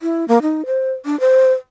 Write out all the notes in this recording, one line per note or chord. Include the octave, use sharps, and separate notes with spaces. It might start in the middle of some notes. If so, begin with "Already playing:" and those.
E4
A#3
D#4
C5
D4
C5